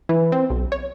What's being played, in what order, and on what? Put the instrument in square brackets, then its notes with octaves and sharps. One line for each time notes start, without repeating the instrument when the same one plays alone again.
[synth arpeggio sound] E3
C4
B1
C#5